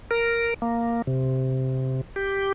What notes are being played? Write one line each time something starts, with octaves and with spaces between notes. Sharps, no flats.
A#4
A#3
C3
G4